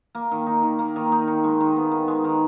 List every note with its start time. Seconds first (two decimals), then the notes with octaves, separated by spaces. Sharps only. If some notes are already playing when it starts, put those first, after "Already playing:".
0.15 A#3
0.31 D#3
0.46 D#4
0.63 D#3
0.79 A#3
0.96 D#3
1.12 D#4
1.28 D#3
1.44 G#3
1.61 D#3
1.76 B3
1.92 D#3
2.08 G#3
2.24 D#3